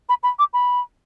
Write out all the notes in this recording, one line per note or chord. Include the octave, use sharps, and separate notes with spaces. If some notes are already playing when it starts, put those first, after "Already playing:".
B5
B5
D6
B5